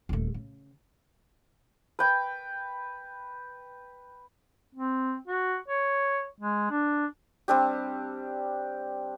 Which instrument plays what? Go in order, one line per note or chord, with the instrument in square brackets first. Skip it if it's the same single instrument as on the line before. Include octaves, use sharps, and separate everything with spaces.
[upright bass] D#1 A3
C#3
[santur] B4 G5
[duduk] C4
F#4
C#5
G#3
D4
[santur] G3 C4 D4 G4